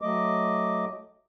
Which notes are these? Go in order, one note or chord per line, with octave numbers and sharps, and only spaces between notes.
F#3 A3 D#5 D6